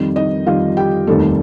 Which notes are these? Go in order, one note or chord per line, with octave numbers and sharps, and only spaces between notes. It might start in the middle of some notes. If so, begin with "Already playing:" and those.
Already playing: F2 D#3 G3
D#4 D#5
F2 D#3 G3 F4 F5
G4 G5
F1 D#2 D#3 G3 A3 A4